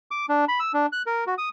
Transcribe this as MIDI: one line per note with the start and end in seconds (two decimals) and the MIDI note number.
0.11 0.26 86
0.29 0.45 62
0.48 0.59 83
0.60 0.72 88
0.74 0.86 62
0.92 1.02 90
1.06 1.24 70
1.27 1.34 66
1.38 1.49 87